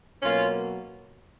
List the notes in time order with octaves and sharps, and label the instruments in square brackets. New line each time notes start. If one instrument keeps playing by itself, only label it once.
[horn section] B2 F#3 A#3 C#4 F4